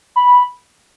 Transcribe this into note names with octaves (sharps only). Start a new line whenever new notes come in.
B5